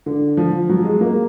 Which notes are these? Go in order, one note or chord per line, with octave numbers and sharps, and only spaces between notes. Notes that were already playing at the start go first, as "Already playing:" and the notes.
D3
F3
F#3
G#3
A#3